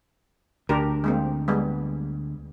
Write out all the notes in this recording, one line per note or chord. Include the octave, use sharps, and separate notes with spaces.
D2 D4 G4 A#4
G#3 A#3 C4
G3 G#3 B3